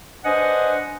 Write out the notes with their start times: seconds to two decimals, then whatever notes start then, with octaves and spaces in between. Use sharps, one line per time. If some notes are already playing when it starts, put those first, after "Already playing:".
0.25 D4 B4 C5 D#5 F#5 G#5